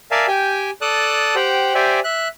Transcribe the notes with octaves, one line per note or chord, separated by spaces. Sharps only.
A#4 D5 E5 F5 G#5 A5
G4 G5 G#5
A4 D5 A5 D#6 F#6
G4 C5 F#5 G5
G4 C5 D5 E5 G#5
E5 F#6